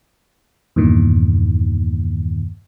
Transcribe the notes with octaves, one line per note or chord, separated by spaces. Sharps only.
E2 G2 A#2 D#3